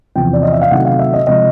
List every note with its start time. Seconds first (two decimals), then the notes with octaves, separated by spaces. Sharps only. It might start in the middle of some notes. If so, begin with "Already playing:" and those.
0.15 E2 C3 F3 G5
0.33 D5
0.43 D#5
0.53 E5
0.61 F5
0.71 C3 D#3 F#3 A3 F#5
0.85 F5
0.99 E5
1.13 D#5
1.27 C3 F3 G#3 D#5